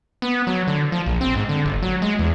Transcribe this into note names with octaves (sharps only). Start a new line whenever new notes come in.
B3
F#3
D3
F3
A#1
C4
G#2
D3
G1
F#3
G#3
E2